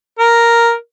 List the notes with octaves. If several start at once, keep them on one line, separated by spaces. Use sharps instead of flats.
A#4